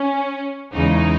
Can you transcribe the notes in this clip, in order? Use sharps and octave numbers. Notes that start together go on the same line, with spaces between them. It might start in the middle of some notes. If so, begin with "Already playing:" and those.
Already playing: C#4
E2 C#3 G#3 D#4